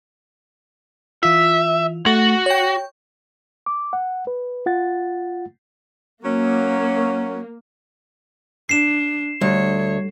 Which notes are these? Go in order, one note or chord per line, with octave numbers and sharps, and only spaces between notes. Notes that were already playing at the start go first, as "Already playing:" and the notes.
E3 F4 E5
A3 F#4
C#5 G5
D6
F#5
B4
F4 F#5 A6
F#3 A#3 C#4
D4 C7 E7
D2 G3 C#5